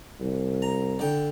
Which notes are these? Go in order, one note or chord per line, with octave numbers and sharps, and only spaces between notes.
C2
A#5
D3 G5